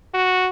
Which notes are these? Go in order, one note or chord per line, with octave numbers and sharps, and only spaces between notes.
F#4